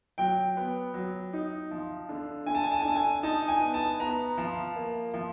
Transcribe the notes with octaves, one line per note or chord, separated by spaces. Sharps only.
F#3 G5
B3
F#3
D#4
F3
D3
D3 G#5
A5
G#5
A5
G#5
D3 A5
G#5
D#4 A5
G#5
B3
A5
B3 A#5
F3
A#3
F3